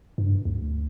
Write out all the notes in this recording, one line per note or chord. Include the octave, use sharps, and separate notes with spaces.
G2
D2